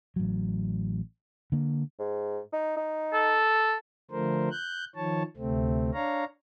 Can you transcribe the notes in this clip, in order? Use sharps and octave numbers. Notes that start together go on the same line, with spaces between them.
A1 F#3
D3 A#3
G#2
D#4
D#4
A4
D3 F3 A3 A#4 C5
F#6 G6
D#3 F3 C#5 A5
D2 C3 A3 C4
D4 C#5 F5 A#5